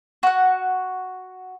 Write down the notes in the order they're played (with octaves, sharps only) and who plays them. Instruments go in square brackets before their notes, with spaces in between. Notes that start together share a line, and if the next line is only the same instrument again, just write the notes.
[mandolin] F#4 F#5